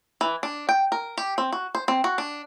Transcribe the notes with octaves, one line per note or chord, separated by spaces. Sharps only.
E3
D4
G5
A#4
G4
C4
F#4
C5
C4
F#4
D4